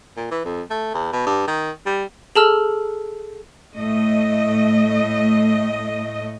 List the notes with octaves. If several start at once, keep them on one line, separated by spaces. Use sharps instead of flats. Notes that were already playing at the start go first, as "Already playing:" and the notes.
A#2
E3
F2
A3
E2
B2
G2
D#3
G3
G#4 A4 A5 A#5 E6 F6
A2 A3 D#5